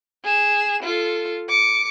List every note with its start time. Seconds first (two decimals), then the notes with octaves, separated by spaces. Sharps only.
0.24 G#4 E7
0.83 F4 A4
1.48 D6 C#7